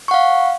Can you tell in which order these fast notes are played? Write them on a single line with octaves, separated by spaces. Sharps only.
C#6 F#5 F5